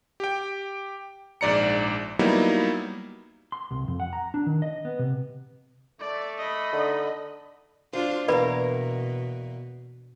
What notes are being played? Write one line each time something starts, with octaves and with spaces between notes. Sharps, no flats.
G4 G5
A#1 G#2 D5 A#5 C#7
F#3 G3 A#3 B3 D#4 E4
C6
C2
F2
F#5
A#5
D4
D#3
D#5
B3
C3
A3 D5
D#5 B5
D3 D#4
D4 F4 C5
E2 B2 A#3 A#4 B4 D5 B5